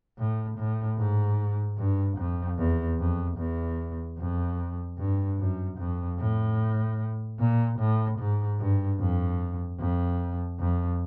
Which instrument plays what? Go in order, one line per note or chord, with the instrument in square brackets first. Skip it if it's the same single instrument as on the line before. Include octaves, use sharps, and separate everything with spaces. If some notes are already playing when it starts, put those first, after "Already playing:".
[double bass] A2
A2
G#2
G2
F2
E2
F2
E2
F2
G2
F#2
F2
A2
A#2
A2
G#2
G2
F2
F2
F2